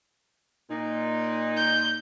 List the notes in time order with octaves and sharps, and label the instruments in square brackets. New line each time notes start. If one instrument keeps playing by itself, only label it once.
[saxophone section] A#2 D#4
[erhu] G6